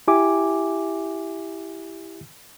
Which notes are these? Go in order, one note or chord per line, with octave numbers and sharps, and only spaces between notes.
E4 G4 E5 G#5 D6